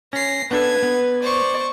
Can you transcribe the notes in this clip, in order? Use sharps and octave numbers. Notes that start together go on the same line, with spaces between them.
C#4 A#6 C7
B3 D4 A4 B4 G#6
B3
C5 D5 C#6